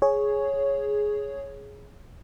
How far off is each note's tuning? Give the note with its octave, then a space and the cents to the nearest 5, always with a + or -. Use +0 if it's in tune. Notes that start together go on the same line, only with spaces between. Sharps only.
G#4 +5 C#5 +0